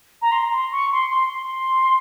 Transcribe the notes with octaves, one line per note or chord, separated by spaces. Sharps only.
A#5
C6
C6
C#6
C6
C6
C6